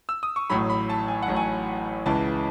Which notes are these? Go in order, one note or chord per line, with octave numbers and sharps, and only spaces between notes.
E6
D#6
C#6
A1 A2 F#3 B5
B5
A5
G#5
F#5
A1 A2 F#3
G#5
C#2 C#3 E3 A5